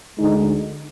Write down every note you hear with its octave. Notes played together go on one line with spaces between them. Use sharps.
D2 D3 G#3 D#4